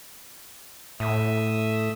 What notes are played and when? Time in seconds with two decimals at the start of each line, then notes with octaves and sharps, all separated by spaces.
1.00 A2 A3 E5 D#6